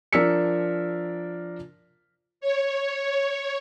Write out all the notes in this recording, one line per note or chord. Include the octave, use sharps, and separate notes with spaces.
F3 D4 A#4 E6 B6 C#7
C#5